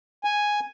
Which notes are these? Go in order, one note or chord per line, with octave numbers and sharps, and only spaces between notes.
G#5